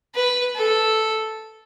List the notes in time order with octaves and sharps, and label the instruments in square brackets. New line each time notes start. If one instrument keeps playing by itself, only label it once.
[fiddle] B4
A4